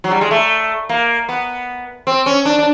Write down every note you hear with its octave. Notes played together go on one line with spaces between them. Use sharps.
F#3
G3
G#3
A3
A#3
B3
C4
C#4
D4
D4